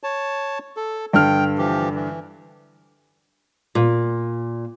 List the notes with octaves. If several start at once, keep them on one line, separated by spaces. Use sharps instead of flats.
C#5 A5
A4
G2 D3 G5 F6
E3 F3 G4
E3
A#2